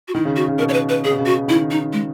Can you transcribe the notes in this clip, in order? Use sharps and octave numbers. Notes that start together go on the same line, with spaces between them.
F#4
D#3 E4
C#3
F#4
C#3
B2 A#4
C#5
B4
B4
C#3 G#4
B2
C#3
F#4
D#3 E4
D#4
G#3